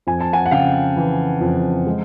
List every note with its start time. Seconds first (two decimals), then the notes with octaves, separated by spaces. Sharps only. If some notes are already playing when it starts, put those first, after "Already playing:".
0.07 F2 G#5
0.21 A5
0.33 F#5 G#5
0.46 F#5
0.51 C#3 F5 G5
0.96 E3
1.41 F2
1.87 G#3